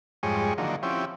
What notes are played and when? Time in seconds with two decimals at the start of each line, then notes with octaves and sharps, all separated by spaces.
0.23 F2 G#2 G3 G#3 C#5
0.58 D3 D#3 F3 F#3 A#3
0.83 F3 C4 C#4 E4 G4